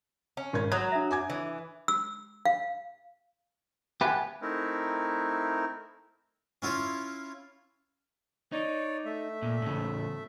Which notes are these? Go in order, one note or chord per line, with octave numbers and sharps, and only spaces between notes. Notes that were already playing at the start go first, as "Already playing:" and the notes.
C#4
G#1 A#4 G#6
F#3 C#5 D#6 G#6
D4 E5
G#5 D6 G#6
E3
E6
F5
G4 B4 E5 F#5 G#5
A3 C4 D#4 E4 A#4
C#4 E4 F4 C#5
D#4 C#5 D5
A3 E5
A#2
A2 C#3